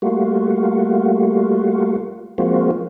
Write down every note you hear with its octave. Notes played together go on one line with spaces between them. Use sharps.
G3 A3 A#3 F4 F#4
F3 G#3 A#3 C4 F4 F#4